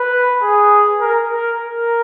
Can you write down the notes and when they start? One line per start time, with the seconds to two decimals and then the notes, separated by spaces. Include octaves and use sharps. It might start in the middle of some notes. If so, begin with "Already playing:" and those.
Already playing: B4
0.43 G#4
1.01 A#4
1.30 A#4
1.59 A#4